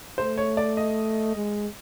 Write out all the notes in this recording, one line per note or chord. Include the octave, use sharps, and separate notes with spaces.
A3 C5
C#5
D5
D#5
G#3